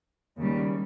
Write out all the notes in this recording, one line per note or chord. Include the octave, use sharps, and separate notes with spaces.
D#2 C#3 G3